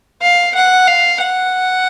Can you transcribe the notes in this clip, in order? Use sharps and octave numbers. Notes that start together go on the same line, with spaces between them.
F5
F#5
F5
F#5